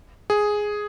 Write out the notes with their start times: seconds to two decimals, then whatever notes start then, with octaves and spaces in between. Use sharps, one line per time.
0.30 G#4